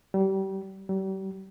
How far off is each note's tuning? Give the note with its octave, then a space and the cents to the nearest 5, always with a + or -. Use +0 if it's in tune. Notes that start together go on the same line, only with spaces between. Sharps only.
G3 -30
G3 -40